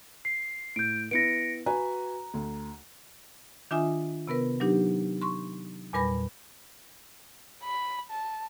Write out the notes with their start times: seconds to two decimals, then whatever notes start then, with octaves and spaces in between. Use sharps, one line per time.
0.25 C7
0.76 A2 G6 D7
1.11 B3 E4 A#6 C#7 D7
1.66 F#4 B4 G#5 A#5
2.34 D2
3.71 D#3 D4 F4 E5 G#5 D#6
4.27 C3 B3 A#4 B4
4.60 F#3 D4 D#4 G4
5.22 C6 C#6
5.93 E2 A#2 G3 B4 B5 A#6
7.63 B5
8.11 A5